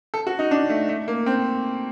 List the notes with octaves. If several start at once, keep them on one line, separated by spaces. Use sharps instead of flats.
A4
F#4
D#4
D4
A3
A3
A#3
C4